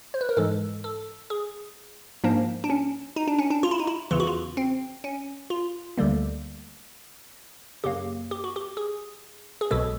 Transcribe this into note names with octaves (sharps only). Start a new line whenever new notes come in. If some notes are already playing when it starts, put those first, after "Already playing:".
C5
B4
A#4
G#2 E3 G#3 A4
A4
G#4
G#2 F3 A#3 D4
D4
C#4
D#4
D4
C#4
D4
F4
E4
D#4
E4
E2 C#3 E3 F4
F#4
F4
C4
C#4
F4
D2 D3 G3 A#3
F#2 C#3 F#3 A#3 G4
G4
F#4
G4
G#4
G#4
B1 B2 G#3 A4